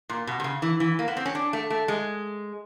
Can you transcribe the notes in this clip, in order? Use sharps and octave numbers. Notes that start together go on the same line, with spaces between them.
A#2
B2
C3
C#3
E3
E3
A#3
B3
C4
C#4
D4
A3
A3
G#3